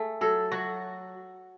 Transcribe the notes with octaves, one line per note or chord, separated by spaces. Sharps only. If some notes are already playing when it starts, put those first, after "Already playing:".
Already playing: A3 G#4
F#3 A4
F#3 F#4